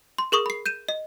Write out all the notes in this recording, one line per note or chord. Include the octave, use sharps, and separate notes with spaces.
C6
G#4 A#4 C#6 D#6
B5 C7
G6 D#7 E7
D#5